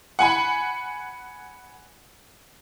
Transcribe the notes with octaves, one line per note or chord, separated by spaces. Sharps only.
F#5 G#5 B5